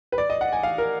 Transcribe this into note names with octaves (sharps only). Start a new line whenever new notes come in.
B4
D5
D#5
F#5
G#5
F5
A#4